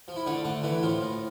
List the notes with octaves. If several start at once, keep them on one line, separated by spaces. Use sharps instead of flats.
F3
E4
D3 A3 D4
D3 A3 D4
D3 E3 E4
A2 F3 F4
A2